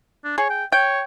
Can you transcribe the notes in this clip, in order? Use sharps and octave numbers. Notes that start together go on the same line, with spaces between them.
D4
G#4 C#5
G5
C#5 G5